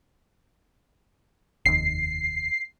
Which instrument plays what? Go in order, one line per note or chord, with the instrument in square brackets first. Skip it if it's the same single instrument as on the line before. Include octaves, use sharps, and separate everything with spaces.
[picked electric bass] F1 D#2 [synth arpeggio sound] C7